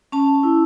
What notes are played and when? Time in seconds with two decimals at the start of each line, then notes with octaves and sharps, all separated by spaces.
0.12 C#4 A5
0.43 E4